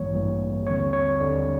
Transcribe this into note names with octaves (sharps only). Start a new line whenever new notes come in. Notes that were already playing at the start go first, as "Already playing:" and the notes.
Already playing: A1 G2 E3 G3 A#3 C#5
A1 G2 E3 G3 A#3
D#2 D3 G3 C4 C#5
C#5
D#2 D3 G3 C4 D5